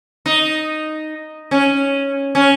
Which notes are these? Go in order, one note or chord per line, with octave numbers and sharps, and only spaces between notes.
D#4
C#4
C#4